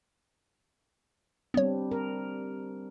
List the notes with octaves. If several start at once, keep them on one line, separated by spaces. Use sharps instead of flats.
G3 B3 C4 D4 C#5
A#4